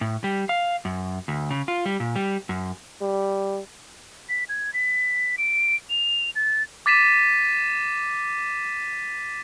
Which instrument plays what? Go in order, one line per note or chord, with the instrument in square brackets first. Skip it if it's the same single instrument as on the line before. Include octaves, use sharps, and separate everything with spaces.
[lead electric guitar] A2
G3
F5
F#2
D2
C#3
F4
G3
A#2
G3
F#2
[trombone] G3
[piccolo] B6
G#6
B6
D7
F7
A6
[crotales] D6 A6 B6 D#7 E7